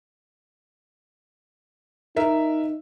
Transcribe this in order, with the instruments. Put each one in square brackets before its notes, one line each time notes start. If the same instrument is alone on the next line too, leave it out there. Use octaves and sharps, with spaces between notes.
[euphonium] D#4 [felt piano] A#4 E5